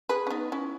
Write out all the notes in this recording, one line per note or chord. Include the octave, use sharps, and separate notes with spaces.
G#4 B4
C#4
B3 D#4
C#4 E4